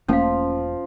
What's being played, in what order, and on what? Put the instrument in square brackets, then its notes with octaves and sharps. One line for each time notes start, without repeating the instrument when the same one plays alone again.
[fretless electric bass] E1 A3 A#3 [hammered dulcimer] F3 [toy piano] C#4 F5